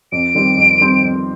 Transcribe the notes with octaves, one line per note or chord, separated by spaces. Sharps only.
F2 D7
D#3 G3 C4
F2
D#3 G3 C4
F2